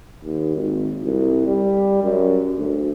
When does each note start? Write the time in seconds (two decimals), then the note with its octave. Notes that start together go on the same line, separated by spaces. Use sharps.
0.24 D#2
0.56 G#1
1.04 C2
1.47 G3
2.03 F#2
2.58 D2